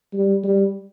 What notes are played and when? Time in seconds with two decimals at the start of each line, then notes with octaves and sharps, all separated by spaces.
0.13 G3
0.44 G3